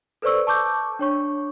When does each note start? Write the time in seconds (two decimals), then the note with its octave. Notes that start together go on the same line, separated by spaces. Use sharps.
0.22 A4 B4 C5 D5 C#6 E6
0.47 A5 C#6 D6 G6
0.99 D4 C#5 C#6